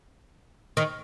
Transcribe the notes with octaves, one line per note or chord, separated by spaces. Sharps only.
D#3